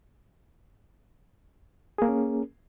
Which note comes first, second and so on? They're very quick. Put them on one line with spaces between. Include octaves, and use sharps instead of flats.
G#4 A#3 A#4 C#4